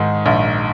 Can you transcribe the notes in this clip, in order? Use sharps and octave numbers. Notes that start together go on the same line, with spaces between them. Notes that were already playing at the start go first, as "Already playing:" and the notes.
Already playing: G#2 D#3
A#1